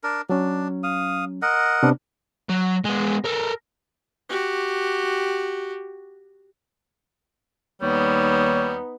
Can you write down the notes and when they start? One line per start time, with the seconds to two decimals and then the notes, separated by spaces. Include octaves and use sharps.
0.04 D4 A#4
0.30 F#3 C#4 D4
0.83 F5 D#6
1.42 A#4 D#5 F#5
1.83 C3 B3 D4
2.49 F#3
2.84 G#3 B3
3.25 A4 A#4
4.29 F#4 G4
7.82 D#2 G3 B3 D#4 C#5